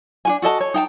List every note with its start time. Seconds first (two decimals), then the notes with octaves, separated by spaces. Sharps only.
0.25 D4 F#4 G#5
0.42 F#4 A4 D#5 A5
0.60 C#5
0.74 D#4 G5 A5